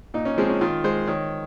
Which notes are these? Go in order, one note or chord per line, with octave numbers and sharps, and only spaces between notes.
A#2 D#4
C#4
F3 G#3 C4
C#4
D#3 F4
G#3 C5
D#3 C#5